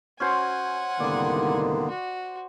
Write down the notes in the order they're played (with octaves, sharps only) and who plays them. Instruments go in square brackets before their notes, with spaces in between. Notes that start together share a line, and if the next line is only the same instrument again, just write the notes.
[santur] C#4 F#4 C5 [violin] F#5 G#5
[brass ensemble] C2 G#2 D#3 [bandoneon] D3 A#3 B3 [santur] D5
[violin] F#4